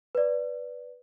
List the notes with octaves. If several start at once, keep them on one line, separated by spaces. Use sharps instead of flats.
B4 D5